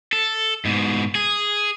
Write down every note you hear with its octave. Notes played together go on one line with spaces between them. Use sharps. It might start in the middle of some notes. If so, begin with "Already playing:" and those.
A4
G#2 B2
G#4